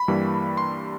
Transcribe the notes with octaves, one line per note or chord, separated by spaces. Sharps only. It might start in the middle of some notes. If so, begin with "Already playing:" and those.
Already playing: B5
G2 E3 G3 A#3
C6